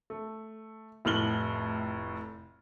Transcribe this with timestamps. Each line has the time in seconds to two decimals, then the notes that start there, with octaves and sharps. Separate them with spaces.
0.10 A3
1.05 F1 A2 F6 F#7 G7